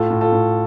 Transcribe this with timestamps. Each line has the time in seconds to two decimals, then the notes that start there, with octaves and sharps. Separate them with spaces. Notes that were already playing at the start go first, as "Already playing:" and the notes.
Already playing: A2 F4 A4
0.10 A2
0.21 F4 A4
0.32 A2